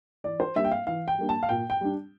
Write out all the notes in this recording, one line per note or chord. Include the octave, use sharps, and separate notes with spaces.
E3 D5
C5
G3 A#3 D4 E5
G5
F5
E3 F5
G5
G3 A#3 D4
A5
F5
A#2 G5
G5
G3 D4